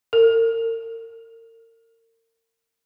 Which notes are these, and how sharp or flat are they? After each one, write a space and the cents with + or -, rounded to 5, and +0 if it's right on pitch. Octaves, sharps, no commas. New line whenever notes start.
A#4 -40